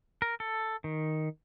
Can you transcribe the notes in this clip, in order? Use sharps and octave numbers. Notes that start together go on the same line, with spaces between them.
A#4
A4
D#3